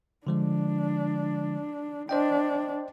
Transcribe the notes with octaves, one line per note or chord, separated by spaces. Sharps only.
D3 F3 G#3 D4
D4 C5 D#5 G5